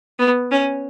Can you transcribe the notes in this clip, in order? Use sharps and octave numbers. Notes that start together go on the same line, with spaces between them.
B3
C#4